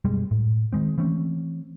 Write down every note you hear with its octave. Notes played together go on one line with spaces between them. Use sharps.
F#2 B2 G3 G#3
A2
D#3 F3 G#3 C4
E3 A3 C4 C#4